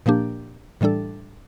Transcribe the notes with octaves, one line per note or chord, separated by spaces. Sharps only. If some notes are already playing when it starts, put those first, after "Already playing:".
A#2 F3 A#3 D4 G4
A2 E3 G3 D4 A4